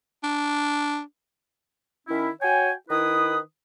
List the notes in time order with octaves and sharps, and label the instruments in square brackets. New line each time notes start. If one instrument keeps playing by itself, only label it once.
[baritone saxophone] D4
[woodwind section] D#3 C#4 E4
F#4 C#5 G5 G#5
D#3 E4 B4 D#6